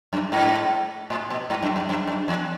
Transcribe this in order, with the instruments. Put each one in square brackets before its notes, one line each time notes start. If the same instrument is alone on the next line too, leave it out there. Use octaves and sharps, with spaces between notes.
[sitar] F#2
G#2
A2
B2
G#2
F#2
F#2
F#2
F#2
E2